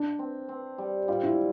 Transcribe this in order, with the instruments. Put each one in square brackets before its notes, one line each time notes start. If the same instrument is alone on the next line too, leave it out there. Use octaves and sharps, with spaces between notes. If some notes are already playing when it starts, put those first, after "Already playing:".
Already playing: [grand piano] D4
[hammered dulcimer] C4
C4
G3
[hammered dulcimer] G3 [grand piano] F4
[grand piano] E4